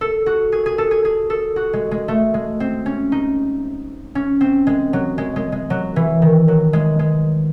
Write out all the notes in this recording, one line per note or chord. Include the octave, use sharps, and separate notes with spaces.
A4
F#4
G#4
G#4
A4
G#4
G#4
A4
F#4
G#3
G#3
A3
G#3
C4
C#4
D#4
C#4
C4
G#3
F#3
G#3
G#3
G#3
F#3
E3
D#3
F#3
G#3
G#3